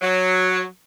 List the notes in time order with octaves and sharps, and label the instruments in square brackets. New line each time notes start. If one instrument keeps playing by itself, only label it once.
[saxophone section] F#3